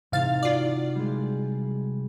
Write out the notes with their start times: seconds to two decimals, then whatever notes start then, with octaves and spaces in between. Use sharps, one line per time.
0.12 G#2 C3 E3 D#4 F5 A6
0.43 F4 F#4 D5
0.96 G3 G#3